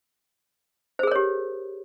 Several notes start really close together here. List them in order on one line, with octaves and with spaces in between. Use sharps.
C5 G#4 A#4 C#5 G4